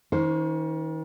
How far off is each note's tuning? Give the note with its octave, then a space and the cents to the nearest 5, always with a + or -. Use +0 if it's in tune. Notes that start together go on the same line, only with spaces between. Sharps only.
D#3 +40 C#4 +25 C5 +0